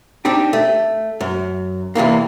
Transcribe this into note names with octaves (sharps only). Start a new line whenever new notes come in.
C4 D4 D#4 G4
A3
F#2
E2 C3 E3 A#3